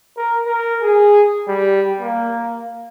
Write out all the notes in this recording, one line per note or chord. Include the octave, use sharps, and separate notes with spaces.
A#4
A#4
G#4
G3
A#3